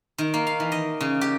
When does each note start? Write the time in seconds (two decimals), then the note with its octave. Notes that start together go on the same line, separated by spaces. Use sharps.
0.18 D#3
0.34 A#3
0.47 F5
0.60 E3
0.72 D#5
1.01 C#3
1.21 G4